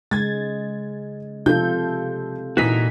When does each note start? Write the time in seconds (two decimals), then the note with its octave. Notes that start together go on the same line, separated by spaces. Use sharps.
0.11 C#3 G#3 G#6 A6
1.46 C3 F3 F4 A4 G6
2.57 A#2 E3 D#4 F#4 B6